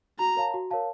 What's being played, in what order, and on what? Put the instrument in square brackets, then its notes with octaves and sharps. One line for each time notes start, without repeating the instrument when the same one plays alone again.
[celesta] F#4 [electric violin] A#5
[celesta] A#4 C#5 F5 A5
F#4
A#4 C#5 F5 A5